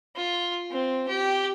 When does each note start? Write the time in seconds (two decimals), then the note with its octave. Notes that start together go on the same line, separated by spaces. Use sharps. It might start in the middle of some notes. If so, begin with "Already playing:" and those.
0.16 F4
0.71 C4
1.08 G4